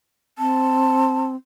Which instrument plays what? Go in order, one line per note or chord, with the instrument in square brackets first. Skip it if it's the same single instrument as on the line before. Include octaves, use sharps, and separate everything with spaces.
[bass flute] C4 [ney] A5